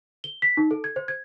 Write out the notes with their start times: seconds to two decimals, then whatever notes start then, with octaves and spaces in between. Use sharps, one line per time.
0.24 G7
0.42 B6
0.57 D#4
0.71 A4
0.84 G#6
0.96 C5
1.08 G#6